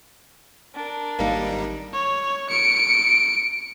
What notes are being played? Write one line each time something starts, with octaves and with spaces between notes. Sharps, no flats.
D4 A#4
G#1 G3 A#3 D#4
C#5
C#7 D7